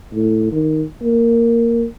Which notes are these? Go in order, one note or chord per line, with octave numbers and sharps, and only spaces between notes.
A2
D#3
A#3